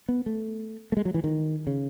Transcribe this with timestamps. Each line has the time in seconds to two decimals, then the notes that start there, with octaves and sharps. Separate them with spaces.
0.09 B3
0.26 A3
0.92 A3
0.97 G#3
1.05 F#3
1.14 E3
1.24 D#3
1.67 C#3